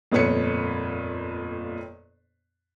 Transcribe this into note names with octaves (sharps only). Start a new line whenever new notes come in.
G1 F2 A#2 B4 C#5 C#7